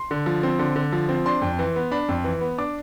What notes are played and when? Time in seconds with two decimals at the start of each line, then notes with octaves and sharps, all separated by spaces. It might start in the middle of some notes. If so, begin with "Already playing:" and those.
Already playing: C6
0.11 D3
0.26 F3
0.43 C4
0.59 D3
0.76 D3
0.92 F3
1.09 C4
1.26 D4 C6
1.42 F2
1.59 E3
1.76 B3
1.91 D4 B5
2.09 F2
2.24 E3
2.41 B3
2.58 D4 D6